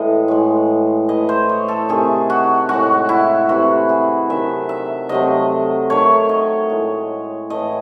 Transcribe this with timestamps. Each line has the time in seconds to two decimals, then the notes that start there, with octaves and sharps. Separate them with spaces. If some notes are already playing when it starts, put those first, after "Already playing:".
Already playing: A2 E3 G#3 D#5
0.28 A2 G#3
1.09 A2 E3 A3 D#5
1.29 C5
1.49 C#5
1.68 A4
1.89 C3 D#3 A3 G#4
2.30 F#4
2.69 A2 G#3 F#4
3.09 E4
3.49 C3 E3 A3 F#4
3.89 G#4
4.29 C3 D#3 F#3 A3 E5
4.69 E5
5.09 C3 F#3 A3 D#5
5.90 D#3 A3 C#5
6.29 D#5
6.70 A2 G#3
7.50 A2 E3 A3 D#5